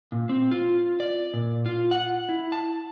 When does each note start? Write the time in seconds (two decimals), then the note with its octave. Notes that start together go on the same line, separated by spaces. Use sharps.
0.12 A#2
0.29 C4
0.51 F4
1.00 D5
1.34 A#2
1.66 F4
1.91 F#5
2.29 E4
2.52 A5